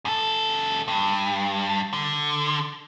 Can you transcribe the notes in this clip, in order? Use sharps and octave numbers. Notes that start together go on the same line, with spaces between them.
F#2 A4
G2
D3